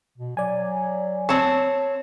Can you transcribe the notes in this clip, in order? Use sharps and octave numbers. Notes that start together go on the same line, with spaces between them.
B2
F#3 D5 G#5
C4 C#5 A5